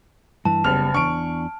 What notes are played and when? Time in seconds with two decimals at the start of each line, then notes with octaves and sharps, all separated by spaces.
0.45 G2 E3 A5
0.64 F#1 G3 B3 F6 F7
0.94 E2 D4 C#6 D7